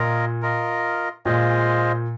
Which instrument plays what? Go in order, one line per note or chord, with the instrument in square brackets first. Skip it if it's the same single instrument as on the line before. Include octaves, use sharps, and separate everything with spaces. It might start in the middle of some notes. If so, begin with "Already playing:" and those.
Already playing: [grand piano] A#2 [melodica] F4 A#4 D#5
[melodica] F4 A#4 D#5
[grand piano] A#2 [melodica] G#3 F4 C5 D#5